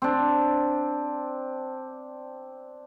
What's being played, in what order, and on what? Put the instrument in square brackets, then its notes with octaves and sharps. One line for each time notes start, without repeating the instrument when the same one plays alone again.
[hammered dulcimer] C4 D4